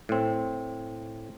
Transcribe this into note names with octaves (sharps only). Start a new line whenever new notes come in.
A2 C4